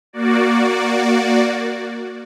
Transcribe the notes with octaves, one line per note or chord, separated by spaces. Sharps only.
A#3 F#4 D5